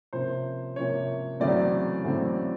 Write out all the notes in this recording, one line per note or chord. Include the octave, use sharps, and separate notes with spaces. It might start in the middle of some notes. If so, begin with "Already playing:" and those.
C3 F3 A#3 C#4 C5
C3 F3 A#3 C#4 C#5
E2 C#3 F#3 A3 C4 D5
E2 C#3 F#3 A3 C4